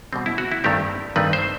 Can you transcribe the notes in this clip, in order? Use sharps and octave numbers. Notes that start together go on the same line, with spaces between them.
B2 G3 C4
E4
F#4
E4
G2 D#3 A3 C4 G4
G2 D#3 A3 C4 B4
C5